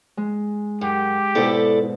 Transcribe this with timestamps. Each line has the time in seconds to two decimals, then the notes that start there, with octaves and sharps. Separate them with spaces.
0.17 G#3
0.81 F#2 G4
1.35 G#2 B2 E4 A4 D5